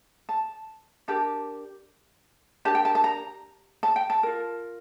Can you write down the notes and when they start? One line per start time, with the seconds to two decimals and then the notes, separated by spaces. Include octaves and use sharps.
0.29 A5
1.08 D4 G4 A#4 A5
2.65 D4 G4 A#4 A5
2.75 G5
2.85 A5
2.95 A5
3.04 A#5
3.83 A5
3.96 G5
4.10 A5
4.23 F4 A#4